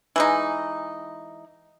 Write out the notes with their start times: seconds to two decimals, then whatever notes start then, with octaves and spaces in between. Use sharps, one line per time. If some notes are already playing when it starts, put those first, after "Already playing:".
0.16 E3 G#3 D#4